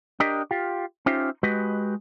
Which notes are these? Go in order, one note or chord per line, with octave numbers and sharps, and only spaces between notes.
D4 G4 A#4 D#5
F4 G4
C#4 D#4 F4 G4 C5 E5
G#3 F#4 G4 B4 D#5